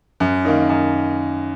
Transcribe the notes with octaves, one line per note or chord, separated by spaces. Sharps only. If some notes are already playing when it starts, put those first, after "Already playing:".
F#2
D#3 A#3 D#4
F#2